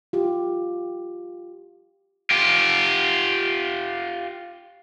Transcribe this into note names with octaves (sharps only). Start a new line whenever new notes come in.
F4 G4
F4 G4